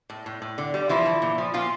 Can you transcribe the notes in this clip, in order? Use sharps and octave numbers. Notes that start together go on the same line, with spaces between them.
A2
A2
A2
D3
G3
E3 F3 E4
D3
A#2
F3
A#2 F3 F4